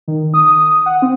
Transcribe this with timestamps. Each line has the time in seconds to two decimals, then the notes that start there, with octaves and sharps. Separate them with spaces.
0.08 D#3
0.34 D#6
0.86 F#5
1.02 C4